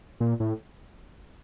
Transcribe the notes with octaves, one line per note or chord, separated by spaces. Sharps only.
A#2
A2